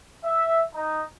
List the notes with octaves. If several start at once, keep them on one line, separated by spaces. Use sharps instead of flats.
E5
D#4